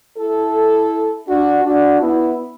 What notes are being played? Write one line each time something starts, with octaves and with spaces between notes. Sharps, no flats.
E4 A4
D4 F#4
D4 F#4
B3 E4